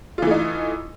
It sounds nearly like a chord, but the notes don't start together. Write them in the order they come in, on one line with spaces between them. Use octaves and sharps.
F4 E3 A3 D#4